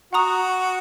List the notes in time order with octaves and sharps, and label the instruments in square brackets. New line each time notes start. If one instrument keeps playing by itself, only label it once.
[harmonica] F#4 [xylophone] F#5 A#5 D#6